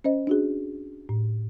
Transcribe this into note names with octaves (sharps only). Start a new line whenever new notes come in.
C#4 C5 D#5
D4 F#4 G#4
A2